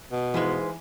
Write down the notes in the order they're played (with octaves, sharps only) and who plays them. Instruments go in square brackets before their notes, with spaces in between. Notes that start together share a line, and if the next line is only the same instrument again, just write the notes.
[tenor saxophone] B2
[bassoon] G#2 [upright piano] E3 [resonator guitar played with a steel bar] G#3 F4 B4